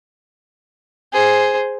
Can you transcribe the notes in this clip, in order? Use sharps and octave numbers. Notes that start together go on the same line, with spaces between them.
G#4 C5